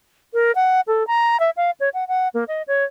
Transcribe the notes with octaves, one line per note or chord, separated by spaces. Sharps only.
A#4
F#5
A4
A#5
E5
F5
C#5
F#5
F#5
A#3
D#5
C#5